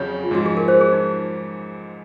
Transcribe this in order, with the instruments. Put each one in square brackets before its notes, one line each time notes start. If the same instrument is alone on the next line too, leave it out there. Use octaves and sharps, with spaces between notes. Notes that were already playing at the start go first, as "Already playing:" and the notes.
Already playing: [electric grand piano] F2 C#3 F#3 C#4 G#4 [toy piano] C#5
[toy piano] F4
[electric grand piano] G#2 F3 G#3 C#4 [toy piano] F#4
[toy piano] G#4
A#4
C5
G#4
D#4